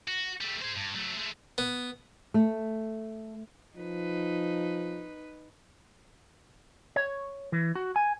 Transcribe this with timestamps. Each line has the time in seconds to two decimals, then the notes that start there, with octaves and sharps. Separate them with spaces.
0.07 F#4
0.41 G3 A3
0.62 G#4 C5
0.76 G2
0.95 F#3 A3
1.17 G#3 A3
1.58 B3
2.34 A3
3.77 F3 D#4 B4
6.96 C#5
7.52 E3
7.75 F#4
7.96 G#5